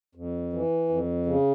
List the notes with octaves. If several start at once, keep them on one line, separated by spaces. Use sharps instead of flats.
F2
E3
F2
C#3